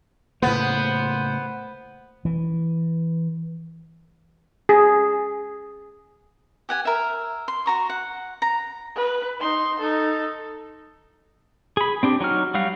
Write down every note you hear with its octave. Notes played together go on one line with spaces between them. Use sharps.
A2 C#3 A#3 B3 C5
E3
G#4
G4 F#5 G#5
A#4 E5
C6
F#4 A#5 C#6
F#5
A#5
B4
D#4 C6
D#4 A4
G#4 B5
C4 D4 G4
F#3 D#4 F#4 F6
F#3 G3 F#4 F5